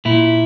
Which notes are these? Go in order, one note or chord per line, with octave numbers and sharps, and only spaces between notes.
A#2 E4